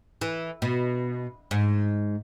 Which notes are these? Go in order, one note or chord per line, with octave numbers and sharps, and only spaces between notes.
E3
B2
G#2